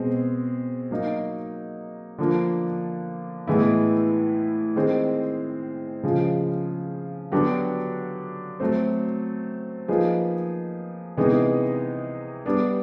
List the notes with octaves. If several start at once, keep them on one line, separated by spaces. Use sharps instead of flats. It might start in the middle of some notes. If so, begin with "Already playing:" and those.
Already playing: B2 G#3 C4
F#3 A#3 D#4
D3 F3 A#3 D4
A2 E3 G#3 B3 E4
D#3 G#3 C4
C#3 F3 G#3
D3 F#3 B3 D4 G4
F#3 A3 C4
F3 A#3 D#4 G#4 B4
C3 E3 G#3 B3 D#4
G3 B3 D4